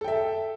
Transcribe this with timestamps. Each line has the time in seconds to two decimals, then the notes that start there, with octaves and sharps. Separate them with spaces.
0.01 A4
0.04 G5
0.08 E5